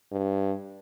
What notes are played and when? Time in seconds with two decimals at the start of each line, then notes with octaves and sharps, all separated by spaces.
0.12 G2